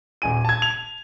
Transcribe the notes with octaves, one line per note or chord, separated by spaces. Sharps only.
D#1 G#5 D#7
A5 G#6
F7